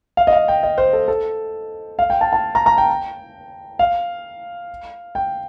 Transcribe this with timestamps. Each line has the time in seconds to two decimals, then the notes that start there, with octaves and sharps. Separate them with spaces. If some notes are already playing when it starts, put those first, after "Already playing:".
0.17 F5
0.27 D#5
0.33 F5
0.48 G5
0.63 D#5
0.78 C5
0.93 A4
1.08 A4
1.99 F5
2.10 G5
2.21 A5
2.33 A5
2.55 A#5
2.66 A#5
2.78 G5
3.79 F5
5.15 G5